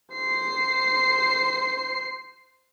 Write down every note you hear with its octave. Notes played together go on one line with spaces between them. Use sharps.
C5 C7